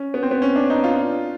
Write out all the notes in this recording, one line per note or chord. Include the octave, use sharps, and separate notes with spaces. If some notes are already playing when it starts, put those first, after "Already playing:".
Already playing: C#4
B3
C4
B3
C#4
D4
D#4
F4